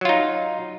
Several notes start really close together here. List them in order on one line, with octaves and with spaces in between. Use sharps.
F#3 F4 D#4